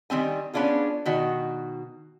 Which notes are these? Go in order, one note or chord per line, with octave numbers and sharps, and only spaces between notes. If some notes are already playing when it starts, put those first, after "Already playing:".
D#3 G3 C4 G#5
B3 C#4 D4 F4 G#4
B2 D#3 F#4